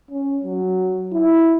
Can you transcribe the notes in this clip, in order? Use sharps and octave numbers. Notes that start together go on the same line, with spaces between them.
C#4
F#3
E4